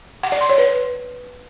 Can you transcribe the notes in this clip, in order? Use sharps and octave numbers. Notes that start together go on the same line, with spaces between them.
F#5
D5
C6
C#5
B4